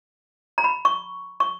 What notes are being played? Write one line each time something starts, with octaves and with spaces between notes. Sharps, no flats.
A#5
B5
C#6
C#6